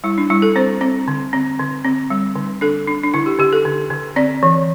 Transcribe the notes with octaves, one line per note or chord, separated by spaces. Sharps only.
G3 E4
D4
G3 E4
A4
C4 C5
C4
D3
C4
D3
C4
G3
D3
D4 A4
D4
D4
D3 E4
G4
D3 G4
A4
D3
D3
C4 D5
E3